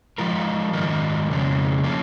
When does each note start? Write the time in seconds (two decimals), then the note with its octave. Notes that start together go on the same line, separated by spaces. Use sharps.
0.18 F3 G#3 F4 A#4
0.73 G#2 D#3 G#3 F4 A#4
1.29 F2 C#3 G#3 C#4
1.84 F3 A#3 C#4